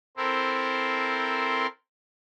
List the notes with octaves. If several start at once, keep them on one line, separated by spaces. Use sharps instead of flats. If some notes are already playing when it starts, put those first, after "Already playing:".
C4 E4 A4 A#4 C5